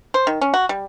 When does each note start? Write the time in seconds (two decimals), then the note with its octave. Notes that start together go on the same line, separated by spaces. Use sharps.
0.14 C5
0.27 D#3
0.41 C#4
0.54 F#4
0.69 G3